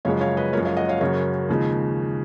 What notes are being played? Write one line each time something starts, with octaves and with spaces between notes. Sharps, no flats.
F#2 C#3 F3 G#3 C#5 F5
C#5 F5
B4 D#5
F#2 F3 G#3 A#4 C#5
C#5 F5
D#5 F#5
C#5 F5
F#2 C#3 F#3 A#4 C#5
D#2 C#3 F3 G#3